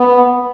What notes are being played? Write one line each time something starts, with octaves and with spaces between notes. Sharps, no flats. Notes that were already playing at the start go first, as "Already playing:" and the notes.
Already playing: B3